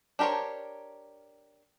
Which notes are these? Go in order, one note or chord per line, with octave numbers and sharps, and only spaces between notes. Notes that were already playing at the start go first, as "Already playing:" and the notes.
D4 G4 A#4 C5 C#5